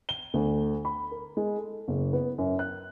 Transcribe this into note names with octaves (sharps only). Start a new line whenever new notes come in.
G7
D2
B5
A#4
G#3
A4
F#1
B3
F#2
F#6